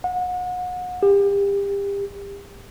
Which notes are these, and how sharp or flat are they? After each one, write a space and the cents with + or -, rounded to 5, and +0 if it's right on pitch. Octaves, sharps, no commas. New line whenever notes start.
F#5 -35
G4 +30